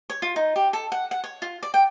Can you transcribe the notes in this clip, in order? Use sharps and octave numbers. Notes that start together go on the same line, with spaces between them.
C#5
F4
D#4
G4
A4
F#5
F#5
C#5
F4
D5
G5